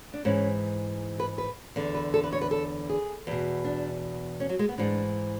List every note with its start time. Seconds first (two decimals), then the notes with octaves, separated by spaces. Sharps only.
0.14 D4
0.25 G#2 E3 C#4
1.20 B4
1.38 B4
1.76 E2 D3
1.95 B4
2.14 A4
2.24 B4
2.33 C#5
2.41 B4
2.51 A4
2.89 G#4
3.27 E2 B2
3.65 D4
4.40 C#4
4.49 F#3
4.59 G#3
4.69 B3
4.78 G#2 E3 D4